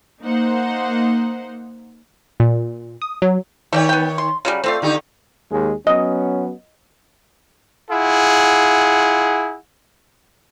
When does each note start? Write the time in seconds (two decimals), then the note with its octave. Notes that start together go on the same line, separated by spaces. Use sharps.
0.22 A#3 D#4 C5 F#5
2.40 A#2
3.02 D#6
3.22 F#3
3.73 D#3 A3 C#5 D5 G5
3.89 B3 G5
4.18 C6
4.45 C#3 F#3 G3
4.64 A3 C4 F4 D5
4.82 D3 D#4 G4
5.52 D#2 G#3
5.87 F#3 B3 C#4 D#5
7.89 E4 F4 G#4 F#5